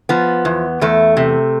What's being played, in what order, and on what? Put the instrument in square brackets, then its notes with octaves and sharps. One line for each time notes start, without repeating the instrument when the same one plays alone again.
[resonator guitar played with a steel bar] F3 B3
E2
E2 A3
C3